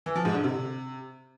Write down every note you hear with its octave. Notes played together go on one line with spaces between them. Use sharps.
E3
F3
G#2
D3
C3